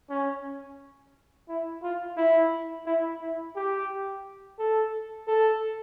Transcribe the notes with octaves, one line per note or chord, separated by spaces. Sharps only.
C#4
E4
F4
E4
E4
E4
G4
A4
A4